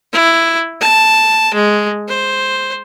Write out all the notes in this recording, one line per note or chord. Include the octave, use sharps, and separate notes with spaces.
E4
A5
G#3
C5